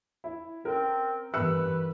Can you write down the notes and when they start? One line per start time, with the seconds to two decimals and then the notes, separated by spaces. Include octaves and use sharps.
0.24 E4
0.64 C4 C#4 A#4
1.34 G2 E3 B4 E6 F#6 C#7